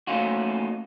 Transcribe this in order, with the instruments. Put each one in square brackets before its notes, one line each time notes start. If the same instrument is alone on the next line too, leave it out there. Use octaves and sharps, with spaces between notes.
[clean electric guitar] A3 A#3 C#4 D#4 F4 F#4